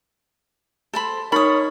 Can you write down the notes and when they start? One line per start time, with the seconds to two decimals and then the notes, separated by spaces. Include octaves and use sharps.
0.94 A4 C5 B5
1.32 D#4 A#4 C#5 B5 D#6